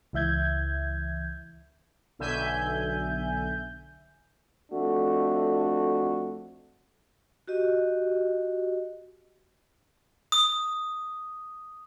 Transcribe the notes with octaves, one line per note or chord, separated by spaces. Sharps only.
C#2 E3 E5 G6 G#6
B1 D3 E5 G#5 G6
F2 A3 D4 F#4
F#4 G4 D#5
D#6